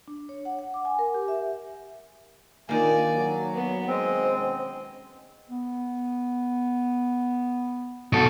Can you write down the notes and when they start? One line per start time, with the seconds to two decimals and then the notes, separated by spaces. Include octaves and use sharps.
0.08 D4
0.29 C#5
0.45 F#5
0.59 F#5
0.74 D6
0.85 G#5
0.99 A#4
1.14 G4
1.28 E5
2.69 A#2 D#3 A#3 D4 F4 D5 G#5
3.14 F#3
3.54 B3
3.88 G#3 C4 D#5
4.21 B2 C#4 C5
5.49 B3
8.13 B2 F#4 A4